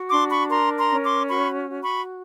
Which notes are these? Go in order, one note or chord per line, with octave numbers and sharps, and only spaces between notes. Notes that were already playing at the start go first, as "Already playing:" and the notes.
Already playing: F#4
D4 C6 D6
B5 C#6
A#4 A#5 C6
A#5 C6
C#4
C6 D6
F#4 B5 C#6
F#4
B5 C#6